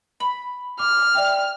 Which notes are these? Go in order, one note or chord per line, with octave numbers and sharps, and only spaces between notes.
B5 F#7
D6 F6
D5 E5 G5